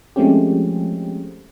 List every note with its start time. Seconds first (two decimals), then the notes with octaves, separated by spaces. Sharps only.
0.16 F3 G#3 A3 C4 C#4 G4